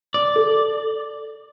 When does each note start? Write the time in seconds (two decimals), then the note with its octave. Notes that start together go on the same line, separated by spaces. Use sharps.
0.14 D5
0.36 A4